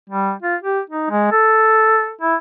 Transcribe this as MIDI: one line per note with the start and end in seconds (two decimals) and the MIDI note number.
0.10 0.32 55
0.42 0.56 65
0.63 0.80 67
0.90 1.09 63
1.10 1.28 56
1.32 2.12 69
2.21 2.36 64